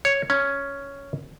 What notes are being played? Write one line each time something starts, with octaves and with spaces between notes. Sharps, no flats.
C#5
C#4